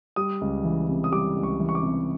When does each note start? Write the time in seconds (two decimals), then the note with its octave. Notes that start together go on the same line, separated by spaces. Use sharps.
0.16 G3 D#6
0.41 C#2
0.64 E3
0.88 C3
1.04 D#6
1.12 G3 D6
1.36 C#2
1.43 C#6
1.60 E3
1.69 C#6
1.75 D6
1.83 C3